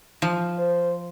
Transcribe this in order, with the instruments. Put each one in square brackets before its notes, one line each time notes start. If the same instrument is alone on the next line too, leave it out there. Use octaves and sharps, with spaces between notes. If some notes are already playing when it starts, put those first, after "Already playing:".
[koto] F3
[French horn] C5